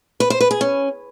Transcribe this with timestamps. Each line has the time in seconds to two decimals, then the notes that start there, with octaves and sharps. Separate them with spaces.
0.20 B4
0.30 C5
0.41 B4
0.51 G#4
0.61 C#4